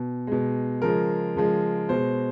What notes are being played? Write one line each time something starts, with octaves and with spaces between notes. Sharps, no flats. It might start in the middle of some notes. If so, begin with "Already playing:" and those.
Already playing: B2
B2 G#3
C#3 F3 G#3 A#4
C#3 F3 G#3
B2 G#3 C5